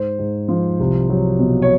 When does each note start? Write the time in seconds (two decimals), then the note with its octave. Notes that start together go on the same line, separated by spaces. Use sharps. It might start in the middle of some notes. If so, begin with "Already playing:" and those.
Already playing: G#2 C5
0.19 G#2
0.48 F3
0.80 C2
1.10 F#3
1.39 B2
1.62 C#5